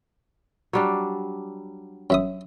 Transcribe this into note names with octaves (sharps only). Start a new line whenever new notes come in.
F#3 G3 D4
F#2 E5 D#6